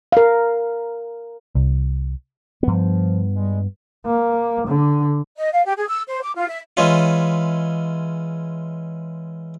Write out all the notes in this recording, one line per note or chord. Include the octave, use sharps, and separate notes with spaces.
A#4 F5
C2
G2 F3 B3
G3 G#3
A#3
D3
D#5
F5
G4
G#4
E6
C5
D6
F4
E5
E3 G#3 C#4 F4